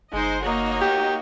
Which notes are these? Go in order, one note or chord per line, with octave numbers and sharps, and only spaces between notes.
G1 G#3 D#4 C5 D#5
A#3 D#4 F#4 C#5 D#5
G4